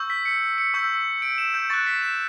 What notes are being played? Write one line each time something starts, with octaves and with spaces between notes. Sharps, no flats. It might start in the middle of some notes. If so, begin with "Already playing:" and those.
Already playing: C#6 E6 G6
B6
C#7
C#7
C#6 E6 G6
D7
E7
G6
C#6 F#6 A6
B6
E7